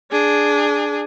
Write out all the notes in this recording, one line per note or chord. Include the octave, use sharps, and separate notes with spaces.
D4 G#4